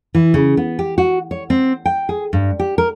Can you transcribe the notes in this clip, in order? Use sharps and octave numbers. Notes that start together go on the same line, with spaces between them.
E3
C#3
B3
G4
F#4
C#5
C4
G5
G#4
G2
G4
A#4